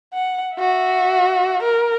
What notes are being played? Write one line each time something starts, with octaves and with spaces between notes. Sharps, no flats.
F#5
F#4 E5
A#4